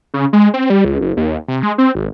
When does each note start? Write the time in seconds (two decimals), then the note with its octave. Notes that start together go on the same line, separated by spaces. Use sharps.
0.14 C#3
0.33 G#3
0.54 C4
0.70 G3
0.85 C#2
1.01 F#1
1.17 D#2
1.48 C3
1.63 G#3
1.78 C4
1.95 G#1